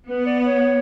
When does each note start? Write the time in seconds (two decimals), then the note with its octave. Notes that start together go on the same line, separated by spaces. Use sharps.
0.09 B3 B4
0.26 D5
0.46 C#5